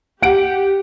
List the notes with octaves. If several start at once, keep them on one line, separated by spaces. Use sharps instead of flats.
G4 F#5 D7